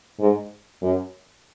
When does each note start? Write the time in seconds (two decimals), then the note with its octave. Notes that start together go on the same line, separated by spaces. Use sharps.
0.20 G#2
0.82 F#2